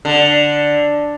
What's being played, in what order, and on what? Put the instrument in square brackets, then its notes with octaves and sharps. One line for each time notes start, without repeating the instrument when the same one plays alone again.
[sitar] D3